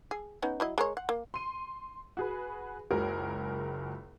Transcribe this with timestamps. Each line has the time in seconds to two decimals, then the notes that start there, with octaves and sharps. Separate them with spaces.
0.11 G#4
0.42 B3 C#4 D#4
0.60 F#3 E4 D#5
0.78 G#3 A#4 C#5
0.97 F#5
1.09 A#3
1.34 C6 D#7
2.17 F#4 G#4 B4
2.91 F#1 C#2 F#3 G#4 A#4